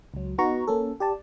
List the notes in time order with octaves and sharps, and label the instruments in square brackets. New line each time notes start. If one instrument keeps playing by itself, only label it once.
[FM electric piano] C#2 F#3
B3 D#4 F#4 A#5 C#6
A#3 C#4 A4
G4 D5 A5